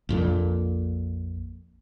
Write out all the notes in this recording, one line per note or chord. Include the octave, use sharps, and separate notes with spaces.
A#1 F2 A#2